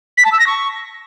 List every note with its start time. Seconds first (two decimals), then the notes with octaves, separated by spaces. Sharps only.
0.17 B6
0.25 A5
0.32 E6
0.39 A#6
0.47 C#6